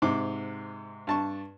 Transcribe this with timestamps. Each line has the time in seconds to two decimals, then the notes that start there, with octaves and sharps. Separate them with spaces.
0.02 G#2 C3 D6
1.07 G2 A5 C#6